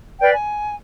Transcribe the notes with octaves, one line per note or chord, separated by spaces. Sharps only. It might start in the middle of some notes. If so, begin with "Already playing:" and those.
B4 D5 F5 G5
G#5